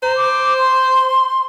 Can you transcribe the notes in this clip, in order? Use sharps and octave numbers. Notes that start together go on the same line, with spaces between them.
C5 A#5
D6
C6